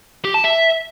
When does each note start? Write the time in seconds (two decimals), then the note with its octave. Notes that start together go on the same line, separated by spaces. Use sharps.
0.25 G4
0.34 A5
0.44 E5